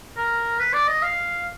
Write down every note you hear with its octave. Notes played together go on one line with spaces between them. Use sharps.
A#4
B4
D5
D#5
F5